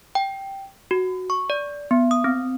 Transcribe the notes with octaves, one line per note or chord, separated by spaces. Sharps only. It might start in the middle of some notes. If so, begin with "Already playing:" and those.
G5
F#4
C#6
D5
B3
D#6
C4